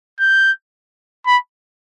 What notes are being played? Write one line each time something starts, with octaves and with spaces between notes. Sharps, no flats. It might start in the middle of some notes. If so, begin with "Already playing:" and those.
G6
B5